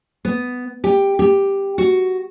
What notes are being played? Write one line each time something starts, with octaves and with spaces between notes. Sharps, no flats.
B3
G4
G4
F#4